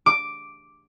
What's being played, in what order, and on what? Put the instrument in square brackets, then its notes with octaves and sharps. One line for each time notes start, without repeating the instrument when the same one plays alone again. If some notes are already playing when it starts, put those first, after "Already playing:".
[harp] D6